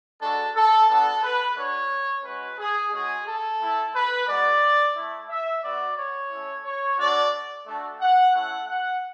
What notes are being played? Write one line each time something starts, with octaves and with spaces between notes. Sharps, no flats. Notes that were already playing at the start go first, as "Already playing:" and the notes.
G#3 D4 F#4 A4
A4
B3 D4 F#4 A4
B4
A3 D4 F#4 C#5
G#3 C#4 F#4 B4
G#4
G#3 C#4 F#4 G#4
A4
A3 E4
B4
G#3 B3 F#4 D5
A3 E4
E5
B3 F#4 D5
C#5
A3 C#4 E4
C#5
A3 D4 F#4 D5
A3 D4 F#4
F#5
A3 C#4 E4 F#5
F#5